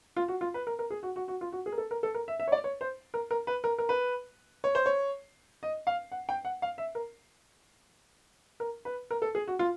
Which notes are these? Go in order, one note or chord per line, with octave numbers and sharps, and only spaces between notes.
F4
F#4
F4
B4
A#4
A#4
G#4
F#4
F#4
F#4
F4
F#4
G#4
A#4
A4
A#4
A4
A#4
E5
E5
C#5
D5
C#5
C5
A#4
A#4
B4
A#4
A#4
B4
C#5
C5
C#5
D#5
F5
F#5
G5
F#5
F5
E5
A#4
A#4
B4
A#4
A4
G#4
F#4
F4